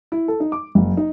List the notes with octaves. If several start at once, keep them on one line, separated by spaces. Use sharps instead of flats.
E4
A4
D#4
D6
F#1
D#4